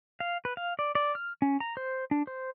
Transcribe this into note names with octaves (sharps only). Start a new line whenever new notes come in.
F5
B4
F5
D5
D5
F6
C#4
A#5
C5
D4
C5